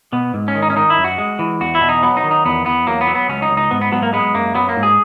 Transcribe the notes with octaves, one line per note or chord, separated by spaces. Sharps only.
B2 B3
G#2
C#4
D#3
D#4
C#4
D#3 D#4
E4
F#2
F#4
G#3
E3
E2 F#4
E4
B2
D#4
F#3 B3
D#4
D#3
D#4
E2 B3
E2 B3
F#3 A#3
B3
F#3
B3
C#2 C#4
D#4
C#2
D#4
G#2 B3
B3
F#3 B3
A#3
G#3 B3
F#2 A#3
F#3 B3
A#3
G#2
G#4